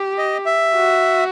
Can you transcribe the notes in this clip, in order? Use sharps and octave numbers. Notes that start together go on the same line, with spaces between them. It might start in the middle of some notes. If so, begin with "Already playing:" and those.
Already playing: G4
D#5
E5
F#4